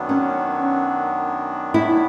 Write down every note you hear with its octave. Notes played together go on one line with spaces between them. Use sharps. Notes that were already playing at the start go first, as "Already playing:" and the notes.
Already playing: F#2 D#3 F#3 B3 D4
C#4
E4